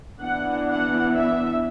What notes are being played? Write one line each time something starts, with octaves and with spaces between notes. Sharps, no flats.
E3 B3 D4 F#5
F#5
E5